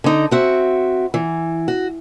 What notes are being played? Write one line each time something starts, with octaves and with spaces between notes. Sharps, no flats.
D3 D#4
C4 F#4 E5
E3
F#4